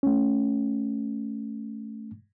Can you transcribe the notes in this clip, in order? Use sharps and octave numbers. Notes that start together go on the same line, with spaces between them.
A3 C#4